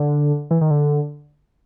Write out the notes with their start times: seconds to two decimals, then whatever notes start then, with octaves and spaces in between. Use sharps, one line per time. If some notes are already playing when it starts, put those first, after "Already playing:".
Already playing: D3
0.51 E3
0.61 D#3
0.70 D3